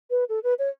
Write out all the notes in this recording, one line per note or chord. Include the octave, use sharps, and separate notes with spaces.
B4
A4
B4
C#5